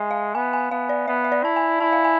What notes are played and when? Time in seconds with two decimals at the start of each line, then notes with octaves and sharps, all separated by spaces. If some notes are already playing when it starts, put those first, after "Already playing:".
Already playing: G#3 E5 G#5
0.11 F5
0.35 B3 G#5
0.53 G#5
0.71 B3 F5
0.89 D5
1.08 B3 E5
1.24 E5
1.32 D5
1.44 E4 A5
1.56 G#5
1.80 E4 A5
1.93 F5
2.04 G#5